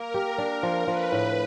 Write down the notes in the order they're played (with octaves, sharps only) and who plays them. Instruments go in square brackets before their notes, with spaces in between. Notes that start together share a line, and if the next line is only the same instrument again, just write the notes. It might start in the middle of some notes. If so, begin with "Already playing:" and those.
Already playing: [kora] A#3 [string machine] A#4
[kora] G4
D4
F3
[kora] F3 [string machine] B4
[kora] A2